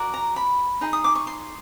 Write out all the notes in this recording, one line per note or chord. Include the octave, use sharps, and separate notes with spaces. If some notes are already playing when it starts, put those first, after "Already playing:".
Already playing: F#4 A#4 D5
A#5
B5
D#4 G#4
D#6
D6
C#6
C6